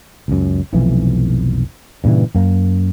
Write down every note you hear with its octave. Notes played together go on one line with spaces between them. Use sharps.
C#2 F#2
F1 B1 F2 E3
G2 A#2 C#3 E3
F#2 A#3